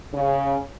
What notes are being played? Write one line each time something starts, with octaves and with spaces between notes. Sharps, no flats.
C#3